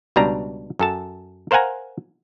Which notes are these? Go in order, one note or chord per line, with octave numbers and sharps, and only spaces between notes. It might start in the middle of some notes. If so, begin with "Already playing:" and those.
C#2 B2 G3 D4 A#5
F#2 A4 A5
A#4 C5 F5 F#5 G#5 A#5